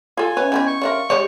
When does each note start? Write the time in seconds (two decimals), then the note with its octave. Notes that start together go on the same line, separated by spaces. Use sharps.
0.17 F4 A4 G#5
0.37 C#4 B4 C#5 D#5 E5
0.52 E3 B3 C4
0.67 C#6
0.82 C#4 D4 A#4 E5 F5 C6
1.10 G3 G#3 G4 G#4 C#5 D5